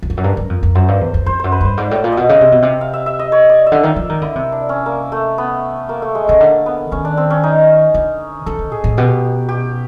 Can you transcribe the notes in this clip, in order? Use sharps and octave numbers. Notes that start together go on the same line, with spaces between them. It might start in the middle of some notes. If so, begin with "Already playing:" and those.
E2
F2
F#2
G2 A#4
F#2
F2
F2
F#2 C5
G2
E2
F2
F2 C5
F#2 C5
B4
G2 C5
G#2 D5
A2 D5
A#2
B2 D#5
C#3 E5
C3
B2
C3
F5
E5
E5
D#5
C#5
D5
E5
D3
D#3 F5
F3 E5
D#3 A#4
D3 E4
C3
D4
C#4
A#3
A3
B3
A#3
A3
G#3
C#3 A3
D3 A#3
B3
D#3 C#4
D4
C4
C#4
D#4
D3
D#3 A4
D#3
A2 G#4
A2
B2 G4
G4